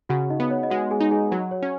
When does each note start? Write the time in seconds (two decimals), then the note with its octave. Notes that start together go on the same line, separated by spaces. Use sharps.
0.09 C#3 F#4 F#5
0.30 D#4 D#5
0.40 B3
0.50 C#5
0.63 D#5
0.70 G#3 F#4 F#5
0.91 G#4 G#5
1.00 D#4
1.11 G#4 G#5
1.31 F#3 F#4 F#5
1.51 C#5
1.62 C#4